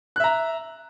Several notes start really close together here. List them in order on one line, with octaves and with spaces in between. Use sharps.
F#6 E5 A#5